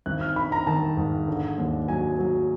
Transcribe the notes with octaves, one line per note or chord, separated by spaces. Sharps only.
G#1 F#6
F6
D#3 B5
A#5
D#3 A5
G#2
D3
D#2
F#3 G#5
F#3